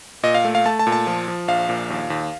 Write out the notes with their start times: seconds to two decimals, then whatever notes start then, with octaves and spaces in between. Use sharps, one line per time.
0.23 A#2 D#5
0.34 F5
0.45 A3
0.55 F5
0.65 A3 A5
0.79 A5
0.87 A#2
0.92 A5
1.07 F3
1.28 F3
1.48 A#1 F5
1.69 A#2
1.90 D#2
2.10 D#2